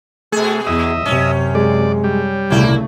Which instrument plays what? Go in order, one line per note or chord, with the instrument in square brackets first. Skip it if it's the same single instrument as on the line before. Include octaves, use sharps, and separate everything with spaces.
[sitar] B2 G#4 [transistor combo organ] A3
[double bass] E2 [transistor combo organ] D#5 E5
[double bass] F#2 C3 [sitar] C#4
[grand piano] G#3 [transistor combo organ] D5
[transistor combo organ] G3
[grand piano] D#1 C2 [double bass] C#3 A3 [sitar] A#3 E4